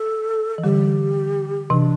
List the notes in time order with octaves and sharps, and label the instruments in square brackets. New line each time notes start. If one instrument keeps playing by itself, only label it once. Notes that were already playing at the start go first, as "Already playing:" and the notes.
Already playing: [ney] A4
[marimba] E3
[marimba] D3 G3 [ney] G4
[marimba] C3 E3 [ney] D4